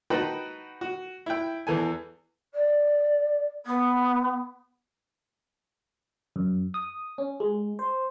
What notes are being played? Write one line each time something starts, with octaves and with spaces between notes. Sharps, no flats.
D#4 F#4 B4 G5 A5 B5
F#4
E4 G5
E2 E3 A4 G#5
D5
B3
F#2
D#6
C#4
G#3
C5